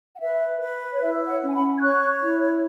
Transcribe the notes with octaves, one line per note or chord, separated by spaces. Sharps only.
F#5
B4 E5
B4
C#5
E4 E5
C#5 F#5
C#4
G#5
F#5 B5
G#6
C#5 C#6 F#6
E4